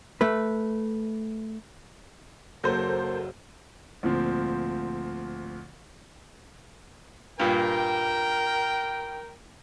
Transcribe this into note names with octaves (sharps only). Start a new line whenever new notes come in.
A3 B4
F#1 F#3 A#3 A4 C5 G6
D2 A#2 F3 C4
G2 A#2 A#4 G5